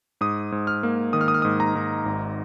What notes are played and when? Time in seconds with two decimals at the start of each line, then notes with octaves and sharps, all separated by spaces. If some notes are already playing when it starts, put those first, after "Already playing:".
0.21 G#2 D#6
0.52 G#2
0.67 F6
0.83 A#3
1.13 D#3 D#6
1.21 F6
1.28 D#6
1.34 F6
1.42 G#2 D#6
1.60 A#5
1.75 G#2
2.06 G#1